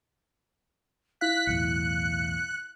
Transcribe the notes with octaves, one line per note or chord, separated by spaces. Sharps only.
E4 F5 F#6 B6
B1 E2 A2 C#7